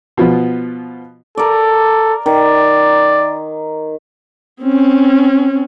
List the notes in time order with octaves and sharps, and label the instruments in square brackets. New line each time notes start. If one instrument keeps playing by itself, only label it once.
[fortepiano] B2 F3 B3
[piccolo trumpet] A4 [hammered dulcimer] A#4 D5
[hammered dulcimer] D#3 [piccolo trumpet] D5
[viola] C4 C#4